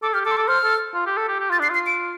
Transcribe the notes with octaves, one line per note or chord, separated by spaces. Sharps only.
A4 D6
G4 F6
A4 D6
C6
A4 D6
C5 F6
A4
F4
G4
A4
G4
G4
F4 A6
D4 C7
F4 C7
D7